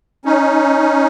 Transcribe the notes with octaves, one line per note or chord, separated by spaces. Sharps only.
C#4 D#4